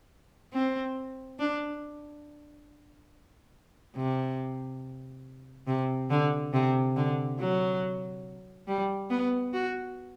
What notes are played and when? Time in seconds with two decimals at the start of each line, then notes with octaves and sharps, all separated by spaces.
0.53 C4
1.39 D4
3.96 C3
5.67 C3
6.10 D3
6.53 C3
6.96 D3
7.39 F#3
8.67 G3
9.10 B3
9.53 F#4